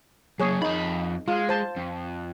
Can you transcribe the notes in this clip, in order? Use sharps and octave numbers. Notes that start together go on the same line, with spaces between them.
F#3 A#3 G#4 C#5
F2 D#4 B5
G#3 F4
C5 A5
F2